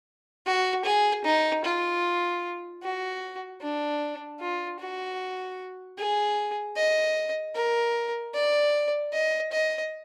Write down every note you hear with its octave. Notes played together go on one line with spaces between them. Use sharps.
F#4
G#4
D#4
F4
F#4
D4
F4
F#4
G#4
D#5
A#4
D5
D#5
D#5